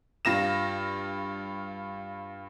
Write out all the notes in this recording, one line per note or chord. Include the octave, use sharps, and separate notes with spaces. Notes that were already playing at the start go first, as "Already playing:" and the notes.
G2 F4 A#6 E7